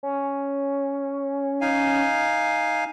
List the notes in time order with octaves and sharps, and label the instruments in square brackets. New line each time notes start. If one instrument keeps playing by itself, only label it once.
[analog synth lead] C#4
[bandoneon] D#4 F5 G#5